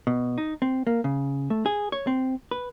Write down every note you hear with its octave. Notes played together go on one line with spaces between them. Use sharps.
B2
D#4
C4
A#3
C#3
A3
G#4
C#5
C4
B4